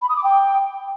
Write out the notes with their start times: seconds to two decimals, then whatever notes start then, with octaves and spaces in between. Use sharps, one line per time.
0.02 B5
0.09 D#6
0.17 D6
0.24 G5